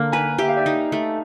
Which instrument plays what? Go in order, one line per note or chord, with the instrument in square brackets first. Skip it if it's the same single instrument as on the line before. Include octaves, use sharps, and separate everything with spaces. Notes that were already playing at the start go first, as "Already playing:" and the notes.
Already playing: [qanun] D3 A#3
[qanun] B4 [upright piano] G#5 A#5
[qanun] G4 [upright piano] E5
[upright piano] F5
D5 E5
[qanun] D#4
A3